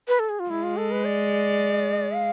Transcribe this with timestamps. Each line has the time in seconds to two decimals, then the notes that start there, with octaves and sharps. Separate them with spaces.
0.08 B4
0.19 A4
0.29 G#4
0.40 F4
0.49 G#3 E4
0.63 F4
0.77 A4
0.91 B4
1.05 D5
2.15 F5